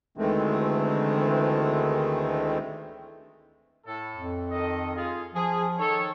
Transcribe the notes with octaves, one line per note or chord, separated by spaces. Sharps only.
D2 D#3 E3 G#3 A3 C4
A2 A4
F2
D#3 A4 D#5
F4 G#4
F3 G#4
D#3 A4 C#5